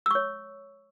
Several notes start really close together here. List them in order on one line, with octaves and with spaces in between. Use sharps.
E6 C#6 C#5